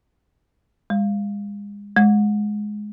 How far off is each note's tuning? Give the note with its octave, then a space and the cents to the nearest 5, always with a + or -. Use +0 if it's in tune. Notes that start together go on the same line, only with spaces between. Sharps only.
G#3 -35
G#3 +10